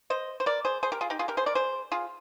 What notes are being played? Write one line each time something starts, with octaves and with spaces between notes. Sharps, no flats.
C5 D#5
C5
A#4 D5
G#4 C5
G#4 C5
G4 A#4
F4 G#4
D#4 G4
F4 G#4
G4 A#4
G#4 C5
A#4 D5
G#4 C5
F4 G#4